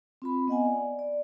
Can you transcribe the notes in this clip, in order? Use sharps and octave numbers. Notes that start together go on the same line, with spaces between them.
C4 F4 B5
B3 D#5 F#5 G#5
D5
D5